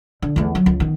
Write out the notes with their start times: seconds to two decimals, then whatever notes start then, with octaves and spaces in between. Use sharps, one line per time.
0.22 D3
0.36 E2 A3
0.55 F#3
0.66 C#2
0.80 D#3 B3